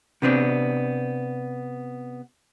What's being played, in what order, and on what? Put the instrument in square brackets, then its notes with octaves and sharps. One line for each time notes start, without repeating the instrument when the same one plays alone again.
[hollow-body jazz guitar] C3 B3 C4 D4